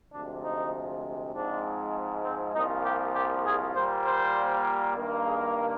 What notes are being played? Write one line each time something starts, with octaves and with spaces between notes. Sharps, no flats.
D2 C3 F3 G#3 D4
D#4
G#2 F3 G#3 C4 D4
C4
C2 A#2 F3 D#4
G4
G4
G#4
A#2 G3 A#3 C5
C5
G2 D#3 A#3
G#4